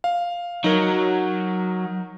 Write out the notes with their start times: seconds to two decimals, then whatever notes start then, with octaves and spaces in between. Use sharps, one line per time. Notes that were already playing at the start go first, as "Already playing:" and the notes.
0.04 F5
0.64 F#3 D#4 A#4